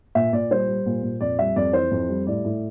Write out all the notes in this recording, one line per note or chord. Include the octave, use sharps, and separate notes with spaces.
A#2 E5
A#2 D5
G3 C5
G3
A#2
A#2
F2 D5
G3 E5
F2 D5
E3 C5
F2
G3
A2 D5
A2